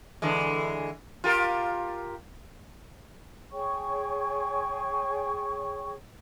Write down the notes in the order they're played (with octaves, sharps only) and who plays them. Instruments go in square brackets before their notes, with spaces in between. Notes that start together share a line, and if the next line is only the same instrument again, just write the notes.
[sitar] D3 E3 G#3
F4 G4 A#4
[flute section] G#4 C#5 G5 C#6